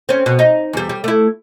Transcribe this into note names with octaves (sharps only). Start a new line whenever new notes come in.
C4 C#4
B2
D#4
E2 G3
G3
A3 E4